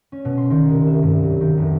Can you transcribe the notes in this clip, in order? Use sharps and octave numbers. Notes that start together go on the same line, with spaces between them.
C#4
B2
C6
D#3
C2
E5
G2
F#3
D#3
F1